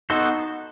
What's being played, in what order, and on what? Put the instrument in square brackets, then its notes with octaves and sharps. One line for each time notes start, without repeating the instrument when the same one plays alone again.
[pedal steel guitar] B3 F#4 A4 C5 [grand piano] D#4